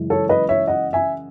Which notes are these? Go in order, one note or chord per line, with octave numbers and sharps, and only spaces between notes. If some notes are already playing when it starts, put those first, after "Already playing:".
Already playing: F#2 C#3 E3 G#3
A4 C#5
B4 D#5
C#5 E5
D#5 F#5
E5 G#5